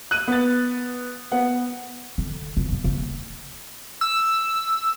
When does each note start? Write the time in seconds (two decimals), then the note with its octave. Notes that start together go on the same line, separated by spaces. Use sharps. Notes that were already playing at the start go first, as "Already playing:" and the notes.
0.11 F#6 D#7
0.27 B3 A6
1.32 B3 B4 F#5
2.18 D3
2.57 C#3 E3
2.72 B3
2.84 C#3 A#3
4.01 E6